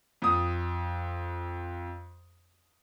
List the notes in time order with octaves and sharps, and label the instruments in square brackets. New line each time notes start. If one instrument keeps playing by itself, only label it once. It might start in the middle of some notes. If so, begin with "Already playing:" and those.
[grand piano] F2 D#6